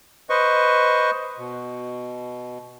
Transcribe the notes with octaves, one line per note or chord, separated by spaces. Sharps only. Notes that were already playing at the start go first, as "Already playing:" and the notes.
B4 C5 D#5 C#6
B2